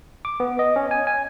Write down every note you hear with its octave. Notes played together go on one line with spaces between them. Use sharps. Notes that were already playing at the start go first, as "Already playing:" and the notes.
D6
B3
D#5
C#4
G#5
G#5